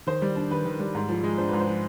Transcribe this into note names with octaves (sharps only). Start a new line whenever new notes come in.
D#3 C5
G3
D4
D#3 B4
D#3
G3
G#2
F3
G#3
D4 C5
G#2 B4
C5
F3